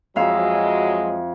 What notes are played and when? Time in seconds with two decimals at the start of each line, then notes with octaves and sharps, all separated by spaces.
0.16 F2 F#3 G#3 E5 F5